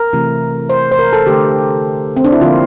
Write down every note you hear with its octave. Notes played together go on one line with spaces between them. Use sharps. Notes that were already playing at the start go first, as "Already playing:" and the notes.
Already playing: A#4
C3 E3 A3
C5
C5
A#4
A4
D3 A3 G4
C4
D4
E4
D3 F3 A#3 F4